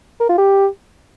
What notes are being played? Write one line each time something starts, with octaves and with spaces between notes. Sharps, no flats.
A#4
F4
G4